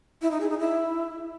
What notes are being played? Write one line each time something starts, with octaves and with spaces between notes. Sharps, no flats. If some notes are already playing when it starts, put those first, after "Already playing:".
E4
D#4
G#4
D#4
E4